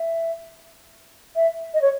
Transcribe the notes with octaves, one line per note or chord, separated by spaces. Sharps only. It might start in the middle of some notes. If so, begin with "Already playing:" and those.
Already playing: E5
E5
D#5
C#5